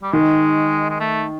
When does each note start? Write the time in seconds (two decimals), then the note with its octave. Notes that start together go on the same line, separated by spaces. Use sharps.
0.03 G3
0.12 D#3 G#3
0.90 G#3
1.00 A3